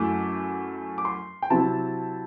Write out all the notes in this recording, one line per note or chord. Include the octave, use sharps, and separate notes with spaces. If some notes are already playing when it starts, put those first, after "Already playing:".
Already playing: F#2 F#3 A3 E4 D6
D6
C6
G5
C3 F#3 C4 E4 A5